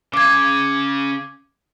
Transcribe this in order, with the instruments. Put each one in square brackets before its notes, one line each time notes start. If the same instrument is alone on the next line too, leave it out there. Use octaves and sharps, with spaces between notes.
[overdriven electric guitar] C#3 C#4 [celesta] D6 G#6